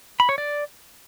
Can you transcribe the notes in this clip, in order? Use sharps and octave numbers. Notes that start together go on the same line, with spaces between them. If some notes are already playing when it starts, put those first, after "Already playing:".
B5
C#5
D5